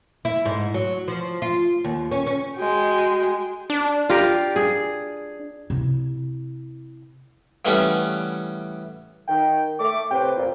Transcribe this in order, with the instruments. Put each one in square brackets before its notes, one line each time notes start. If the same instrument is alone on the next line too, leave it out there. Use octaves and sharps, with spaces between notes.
[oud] E4
G#2
F#3
F3
F4
D#2
C#4
C#4
[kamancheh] G#3 G5 [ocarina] F#4
[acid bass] D4
[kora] F4 G4 A#4
G#4
[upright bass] C3 E4
[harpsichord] C#3 E3 G3 A3 B3 C#4
[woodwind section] D#3 G5
A3 D6
A2 C3 C4 B4 G5
F2 A#2